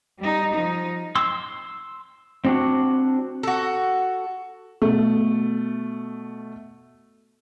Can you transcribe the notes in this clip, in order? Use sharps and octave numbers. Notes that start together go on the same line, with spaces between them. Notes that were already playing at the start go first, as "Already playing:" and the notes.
G3 D#4
F3 D#4
C6 E6
C4 D4 F#4
F#4 A4
B2 A3